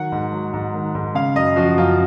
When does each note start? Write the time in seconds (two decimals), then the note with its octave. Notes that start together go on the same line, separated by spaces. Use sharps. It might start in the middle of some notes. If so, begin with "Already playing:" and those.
Already playing: D#3 F#3 F#5
0.12 G#2
0.32 F#3
0.53 G#2
0.74 D#3
0.95 G#2
1.15 C#3 F5
1.35 F#2 D#5
1.56 F3 F#4
1.78 F#2 F4